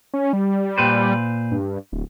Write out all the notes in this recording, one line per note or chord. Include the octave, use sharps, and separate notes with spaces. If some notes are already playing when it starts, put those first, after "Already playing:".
C#4
G3
A#2 B4 C5
G2
D1